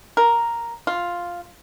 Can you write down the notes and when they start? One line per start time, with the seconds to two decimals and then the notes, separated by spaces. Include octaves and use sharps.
0.17 A#4
0.87 F4